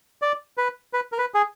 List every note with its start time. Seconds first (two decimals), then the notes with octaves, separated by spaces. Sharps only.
0.22 D5
0.57 B4
0.93 B4
1.12 A#4
1.18 B4
1.34 G#4